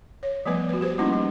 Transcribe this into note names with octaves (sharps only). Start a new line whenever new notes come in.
C#5
F3 G3 A3 B3 B4
F#4 B4
G4 B4 C5
G3 A3 A#3 C#4 D#4 E4
G3